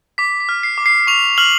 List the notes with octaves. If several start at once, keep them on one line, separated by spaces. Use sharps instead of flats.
D6 B6
B6
F6
C7
D6
C7
C#6 F7
F6 F#7